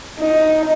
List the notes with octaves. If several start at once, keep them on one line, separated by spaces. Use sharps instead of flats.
D#4